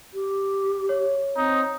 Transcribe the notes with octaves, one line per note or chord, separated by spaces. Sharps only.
G4
C#5
C4 D#4